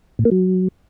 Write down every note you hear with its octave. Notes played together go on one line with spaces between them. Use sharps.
A2
A#3
F#3